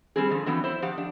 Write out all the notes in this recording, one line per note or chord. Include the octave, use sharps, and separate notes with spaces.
G3 C4 G#4
D3 F3
E3 F#3 B3 C4
E4 C5
F3 G4 F5 F#5
D4